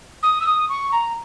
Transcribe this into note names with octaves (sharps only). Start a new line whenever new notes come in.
D#6
E6
D#6
C#6
A#5